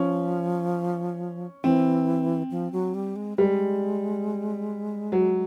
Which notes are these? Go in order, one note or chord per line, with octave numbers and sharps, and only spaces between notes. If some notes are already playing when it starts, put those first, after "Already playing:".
Already playing: F3 C#4
E3 C4
F3
F#3
G3
G#3
G3 G#3
F#3